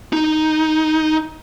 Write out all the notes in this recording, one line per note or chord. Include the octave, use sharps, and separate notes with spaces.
D#4